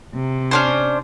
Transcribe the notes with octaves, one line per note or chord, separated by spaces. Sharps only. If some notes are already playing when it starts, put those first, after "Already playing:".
C3
C#4 D4 C5